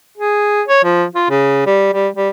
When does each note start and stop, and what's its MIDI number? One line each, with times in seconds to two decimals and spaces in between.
0.18 0.62 68
0.68 0.84 73
0.84 1.05 53
1.15 1.25 65
1.30 1.65 49
1.67 1.91 55
1.94 2.08 55
2.17 2.29 55